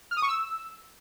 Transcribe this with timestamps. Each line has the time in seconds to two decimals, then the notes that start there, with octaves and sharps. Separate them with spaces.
0.11 F6
0.17 D#6
0.22 C#6
0.28 E6